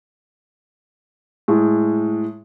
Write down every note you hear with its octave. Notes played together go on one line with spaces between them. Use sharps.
A2 G#3